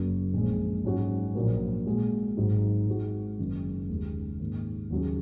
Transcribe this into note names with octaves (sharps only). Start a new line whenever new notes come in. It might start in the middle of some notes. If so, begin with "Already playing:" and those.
Already playing: F#1 F#2 F#3 A#3 F#4
A#1 A#2 G#3
G#2 F#3 C#4 F#4
A#1 A#2 F#3 A#3
A#2 G#3 F#4
G#1 G#2 F#3 D#4 F#4
G#2 G#3 F#4
F#1 F#2 D#3
D#2 C#3 G#3
G#2 D#3 A#3
D#2 C#3 F#3 C#4 G#4